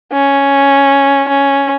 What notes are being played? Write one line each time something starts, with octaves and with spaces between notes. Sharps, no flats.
C#4
C#4